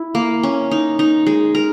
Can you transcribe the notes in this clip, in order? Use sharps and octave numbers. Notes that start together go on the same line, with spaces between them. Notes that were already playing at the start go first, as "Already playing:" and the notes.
Already playing: E4
A#3
C#4
D#4
D#4
G#3
A#4